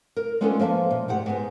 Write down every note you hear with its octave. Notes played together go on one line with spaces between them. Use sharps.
A#4
G#3 B3 C#4 D4 F4 A4
F3 A#3 E5 A5
A#2
D2 G#2 G4 F#5
G#2 B3